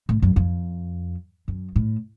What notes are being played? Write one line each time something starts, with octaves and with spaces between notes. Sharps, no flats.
A2
F#2
F2
F#2
A2